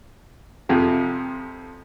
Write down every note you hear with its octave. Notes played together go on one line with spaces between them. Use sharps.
F2 C3 F3